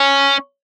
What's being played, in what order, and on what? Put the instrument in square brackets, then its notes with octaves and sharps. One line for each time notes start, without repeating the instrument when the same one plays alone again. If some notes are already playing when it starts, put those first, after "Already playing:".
Already playing: [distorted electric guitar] C#4